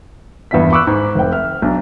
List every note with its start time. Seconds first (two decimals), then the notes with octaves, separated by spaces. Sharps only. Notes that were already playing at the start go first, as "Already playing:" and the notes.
0.51 D#1 E2 G2 E4 D5 B6
0.72 B5 C#6 D6 E6 F#6
0.87 G#2
1.15 F1 C5 G5
1.32 E5 F6
1.62 B1 D4 A#5